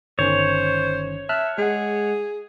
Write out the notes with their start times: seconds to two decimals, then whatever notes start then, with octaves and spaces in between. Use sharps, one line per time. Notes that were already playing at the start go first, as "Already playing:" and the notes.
0.19 G1 D#3 C#4 C5 C#5
1.29 E5 A5 F6 F#6
1.58 G#3 G#4 F#5